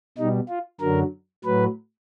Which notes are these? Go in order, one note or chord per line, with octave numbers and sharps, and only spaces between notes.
B2 G3 D#4
F4
F#2 D3 F#3 A#4
A2 F#3 B4